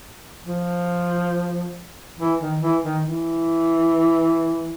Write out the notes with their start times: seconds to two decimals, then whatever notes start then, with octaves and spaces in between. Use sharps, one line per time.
0.45 F3
2.19 E3
2.40 D#3
2.62 E3
2.83 D#3
3.06 E3